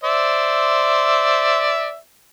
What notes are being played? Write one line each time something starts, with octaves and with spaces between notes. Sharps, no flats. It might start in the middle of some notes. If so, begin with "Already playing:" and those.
C5 D5 E5